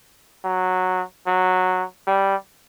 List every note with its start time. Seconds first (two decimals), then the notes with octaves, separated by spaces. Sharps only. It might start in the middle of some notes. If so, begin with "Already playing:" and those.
0.45 F#3
1.27 F#3
2.07 G3